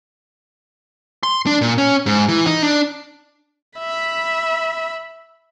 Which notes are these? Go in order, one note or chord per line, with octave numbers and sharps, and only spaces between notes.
C6
D4
A#2
C#4
G#2
E3
D#4
D4
E5 B5